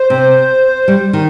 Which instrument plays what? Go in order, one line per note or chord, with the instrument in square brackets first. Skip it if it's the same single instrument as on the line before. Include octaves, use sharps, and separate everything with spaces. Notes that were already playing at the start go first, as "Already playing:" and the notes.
Already playing: [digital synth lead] C5
[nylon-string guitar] C3
G3
D#3